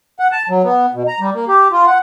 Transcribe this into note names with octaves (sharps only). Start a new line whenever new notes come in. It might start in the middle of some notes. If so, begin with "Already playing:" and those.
F#5
A5
F#3
B3
B2
A#5
G3
A#3
G4
F4
F#5